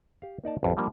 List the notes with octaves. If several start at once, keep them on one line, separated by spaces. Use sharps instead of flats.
G4 F5
A#3 D#4 D5 A5
A1 F2
F3 G3 A#3 D4